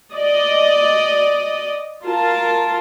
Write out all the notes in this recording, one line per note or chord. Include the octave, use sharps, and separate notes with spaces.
D5 D#5
F4 A#4 A5